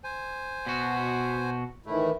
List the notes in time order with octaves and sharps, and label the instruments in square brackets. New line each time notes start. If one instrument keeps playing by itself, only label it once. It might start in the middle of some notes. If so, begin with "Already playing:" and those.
[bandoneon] C5 G#5
[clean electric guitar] B2 F#4
[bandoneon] A2 A3 [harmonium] D#3 E3 E4